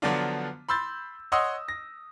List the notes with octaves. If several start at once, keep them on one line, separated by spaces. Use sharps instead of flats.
D3 F3 F#3 B3 D4 F4
B5 C6 E6 G6 A6
C#5 D#5 F#5 C6 D#6 E6
A#6